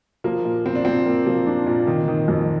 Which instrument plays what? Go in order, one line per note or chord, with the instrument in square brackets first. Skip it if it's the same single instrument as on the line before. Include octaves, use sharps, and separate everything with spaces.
[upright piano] F3 [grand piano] A#3
[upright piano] A#2
[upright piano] F3 [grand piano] C4
[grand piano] D4
[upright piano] F3 [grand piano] C4
[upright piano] A#3
F3
D4
A#2
D#3
D#3
F2